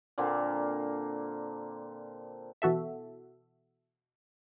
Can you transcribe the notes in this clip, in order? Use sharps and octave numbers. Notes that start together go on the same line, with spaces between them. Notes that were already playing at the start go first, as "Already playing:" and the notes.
A#2 D3 A#3 C4
B2 E3 F#4 A4 E5